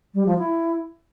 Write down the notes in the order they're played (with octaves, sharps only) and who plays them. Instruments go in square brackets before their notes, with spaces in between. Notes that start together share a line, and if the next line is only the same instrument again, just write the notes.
[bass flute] G3
F3
E4